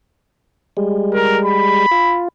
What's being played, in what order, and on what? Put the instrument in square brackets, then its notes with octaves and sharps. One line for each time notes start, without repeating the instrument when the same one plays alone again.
[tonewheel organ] G3 G#3
[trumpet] A#4
B5
[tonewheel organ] F4